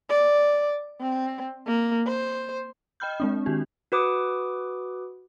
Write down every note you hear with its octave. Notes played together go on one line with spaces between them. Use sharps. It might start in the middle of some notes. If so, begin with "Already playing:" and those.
D5
C4
A#3
C5
D#5 G5 B5 F6 G6
G#3 C4 D4
D#3 F#4 G4
F#4 B4 D6 D#6